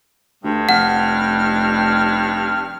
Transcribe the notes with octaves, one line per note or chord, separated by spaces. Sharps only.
D2 G2
F1 F#5 F6